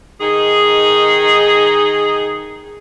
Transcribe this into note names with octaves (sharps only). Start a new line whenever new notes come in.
D#3 D#4 G#4